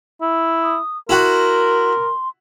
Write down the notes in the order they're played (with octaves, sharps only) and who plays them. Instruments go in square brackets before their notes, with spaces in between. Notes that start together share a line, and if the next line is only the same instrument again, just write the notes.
[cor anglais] E4
[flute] D#6
[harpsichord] E4 F#4 [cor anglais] A#4 [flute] C6